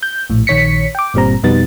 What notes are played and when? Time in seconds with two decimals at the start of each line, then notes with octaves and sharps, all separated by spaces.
0.03 G6
0.30 A#1 A2
0.47 A#1 D#3 C#5 B6 C#7
0.95 G5 D6
1.14 G1 A#2 G3 C4 A#5
1.43 F2 B2 G3 B3 D#4 A6